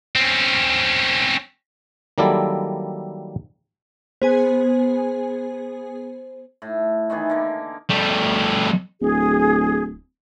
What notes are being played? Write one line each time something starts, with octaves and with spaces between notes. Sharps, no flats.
C4 C#4
D#3 F#3 G3 A#3 E4 A4
B3 G#4 C5 G#5
A2
D#3 E3 B3 G#4
D3 A#3
G3 A3
D1 G#4